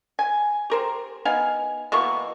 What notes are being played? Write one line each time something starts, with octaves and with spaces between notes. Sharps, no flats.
G#5
G4 A#4 C5
B3 D#4 F5 G#5
B2 E3 A#3 C#6